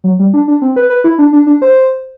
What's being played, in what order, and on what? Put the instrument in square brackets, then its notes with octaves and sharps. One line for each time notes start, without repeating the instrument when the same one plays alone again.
[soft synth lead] F#3
G3
D4
D4
C4
B4
B4
E4
D4
D4
D4
C5